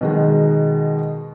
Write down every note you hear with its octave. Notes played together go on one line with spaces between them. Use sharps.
B2 D#3 G#3